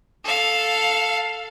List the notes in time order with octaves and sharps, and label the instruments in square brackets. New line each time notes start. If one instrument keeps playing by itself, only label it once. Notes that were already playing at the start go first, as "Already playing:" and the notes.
[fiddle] A4 F5